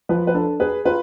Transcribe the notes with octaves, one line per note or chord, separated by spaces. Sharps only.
F3 B4
B4
D4 A4
G#4 B4
F4 B4